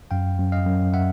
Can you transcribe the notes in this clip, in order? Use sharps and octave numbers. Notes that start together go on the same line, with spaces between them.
F#2 F5 G5
F#2
D#5 F5
F#2
E5 F#5